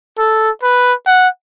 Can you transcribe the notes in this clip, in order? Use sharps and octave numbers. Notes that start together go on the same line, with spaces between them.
A4
B4
F#5